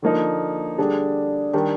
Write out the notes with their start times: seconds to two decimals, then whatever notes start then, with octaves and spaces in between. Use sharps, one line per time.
0.02 D3 F3 A#3 D#4
0.78 D3 G3 D4 G#4
1.53 D#3 G3 D4 G4